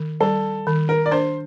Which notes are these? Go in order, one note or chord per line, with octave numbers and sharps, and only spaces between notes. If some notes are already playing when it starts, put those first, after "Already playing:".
Already playing: D#3
G3 A4
D#3
A#4
D5
D4 C5